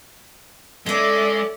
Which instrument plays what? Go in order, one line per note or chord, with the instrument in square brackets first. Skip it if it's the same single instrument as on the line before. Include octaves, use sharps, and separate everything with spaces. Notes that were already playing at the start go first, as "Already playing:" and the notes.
[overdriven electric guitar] G#3 [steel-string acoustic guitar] A3 C#4 [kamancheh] D5 E5